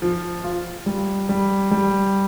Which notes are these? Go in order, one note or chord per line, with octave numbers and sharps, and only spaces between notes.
F3
F4
G3
G3
G3